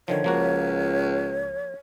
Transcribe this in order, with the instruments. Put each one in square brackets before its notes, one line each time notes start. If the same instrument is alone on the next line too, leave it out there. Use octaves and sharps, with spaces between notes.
[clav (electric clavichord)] D3 D#3 F3 [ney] C#5
[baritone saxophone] C#2 [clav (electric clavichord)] F3 A#3 F#4